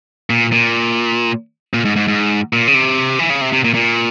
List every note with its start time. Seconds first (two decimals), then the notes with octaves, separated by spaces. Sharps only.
0.30 A#2
0.52 A#2
1.74 A#2
1.85 G#2
1.96 G#2
2.08 G#2
2.53 A#2
2.68 C#3
2.74 C3
3.19 E3
3.30 C#3
3.41 C3
3.53 C3
3.64 A#2
3.74 A#2